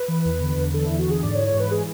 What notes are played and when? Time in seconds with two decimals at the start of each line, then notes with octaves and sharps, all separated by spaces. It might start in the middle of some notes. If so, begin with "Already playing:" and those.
Already playing: B4
0.08 E3
0.25 E2
0.41 D3
0.57 E2
0.73 D3 A4
0.85 E2 E4
0.99 F#4
1.06 D3 G#4
1.23 G#2 D5
1.35 C#5
1.39 E3
1.47 C#5
1.55 G#2 B4
1.71 E3 G#4